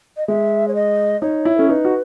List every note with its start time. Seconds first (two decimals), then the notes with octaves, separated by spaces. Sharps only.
0.17 D#5
0.28 G#3 E5
0.68 C#5
0.75 D#5
1.22 D#4 C#5
1.45 E4
1.58 C#4 A4
1.69 D#4 B4
1.85 F#4